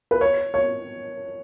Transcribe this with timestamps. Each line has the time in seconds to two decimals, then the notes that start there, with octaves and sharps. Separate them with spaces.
0.11 B4
0.21 C#5
0.54 C#5